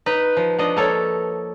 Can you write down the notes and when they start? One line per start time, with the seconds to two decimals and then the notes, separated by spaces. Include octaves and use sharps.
0.06 D#4 B4
0.37 F3
0.59 F3 D4 D#5
0.77 A#3 A4 C#5